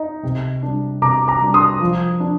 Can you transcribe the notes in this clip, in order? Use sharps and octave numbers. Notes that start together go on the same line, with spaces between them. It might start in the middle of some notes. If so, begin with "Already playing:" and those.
Already playing: D#4
C3
G3 D4
C3 A#5 D6
A#5 D6
G3 D4
C6 D#6
F3
D4